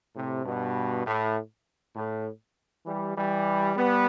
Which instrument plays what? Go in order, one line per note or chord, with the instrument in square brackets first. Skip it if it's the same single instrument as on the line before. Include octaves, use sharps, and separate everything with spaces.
[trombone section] A2 C3
G2 B2
A2
A2
E3 G3
E3 G3
G3 B3